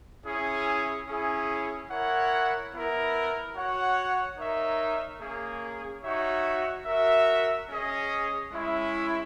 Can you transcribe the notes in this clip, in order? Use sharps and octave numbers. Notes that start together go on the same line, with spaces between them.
C#4 E4 G#4
C#4 E4 G#4
E4 A#4 C#5 F#5
B3 E4 A#4
F#4 C#5 F#5
D#4 A#4 C#5 E5
A#3 C#4 G#4
D#4 F#4 C#5 E5
F#4 A#4 E5
C#4 G#4 D#5
G#3 C#4 E4